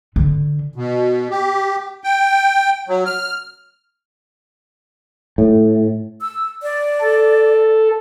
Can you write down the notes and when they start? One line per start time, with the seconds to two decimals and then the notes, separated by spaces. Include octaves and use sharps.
0.16 D3
0.75 B2
1.30 G4
2.04 G5
2.88 F#3
3.06 F6
5.38 A2
6.21 E6
6.63 D5
7.01 A4